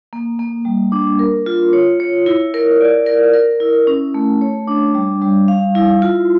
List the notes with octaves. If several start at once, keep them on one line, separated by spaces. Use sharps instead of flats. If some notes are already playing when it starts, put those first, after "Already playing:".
A#3
A#3
G3
D4
A#4
F4
C#5
C#5
E4
A#4
D5
A#4
A#4
E4
C#4
A3
C#5
D4
G3
G3
F5
E4
F4